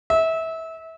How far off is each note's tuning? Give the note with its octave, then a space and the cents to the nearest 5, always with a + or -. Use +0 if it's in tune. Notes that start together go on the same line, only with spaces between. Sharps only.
E5 -25